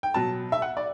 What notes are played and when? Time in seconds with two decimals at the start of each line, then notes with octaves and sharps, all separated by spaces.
0.03 G5
0.14 B2 F#3 A5
0.52 E5
0.62 F#5
0.77 D5